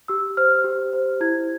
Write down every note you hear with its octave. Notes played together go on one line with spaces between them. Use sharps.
G4 E6
C5 F6
G4
C5
E4 G#6